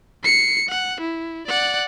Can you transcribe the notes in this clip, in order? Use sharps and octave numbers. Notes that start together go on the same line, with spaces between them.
C7 C#7
F#5
E4
D5 F#5